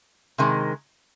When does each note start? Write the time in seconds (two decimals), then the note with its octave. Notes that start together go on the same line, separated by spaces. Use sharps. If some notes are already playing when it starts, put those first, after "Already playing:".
0.38 C3 D#3 G#3